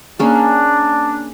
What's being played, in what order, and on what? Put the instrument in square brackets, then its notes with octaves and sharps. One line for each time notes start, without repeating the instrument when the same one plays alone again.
[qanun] A#3 C#4 G#4 [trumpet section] D4